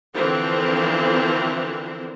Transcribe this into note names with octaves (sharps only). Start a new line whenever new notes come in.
D3 E3 F3 C4 A#4 C5